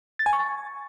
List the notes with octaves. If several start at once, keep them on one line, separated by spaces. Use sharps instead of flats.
A6
G#5
C#6